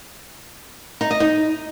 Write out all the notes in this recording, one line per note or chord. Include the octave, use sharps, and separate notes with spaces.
D#4
D#5
D#4